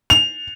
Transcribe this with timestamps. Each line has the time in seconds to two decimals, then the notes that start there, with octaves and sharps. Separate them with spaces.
0.10 F7